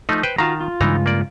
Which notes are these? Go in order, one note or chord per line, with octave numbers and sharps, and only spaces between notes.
F3 A3 D#4
B4 C5 G5
D#3 F4 F#4 F5 A5 A#5
F4
G2 C#3 E3 G#3 D#4 A#5
A#3 D5